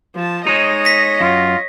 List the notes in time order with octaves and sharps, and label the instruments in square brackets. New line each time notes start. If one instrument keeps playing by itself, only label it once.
[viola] F3 A5
[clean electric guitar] G#3 D#4 [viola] C#5 D#5
[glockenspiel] A#6 B6
[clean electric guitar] F#2 [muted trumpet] F4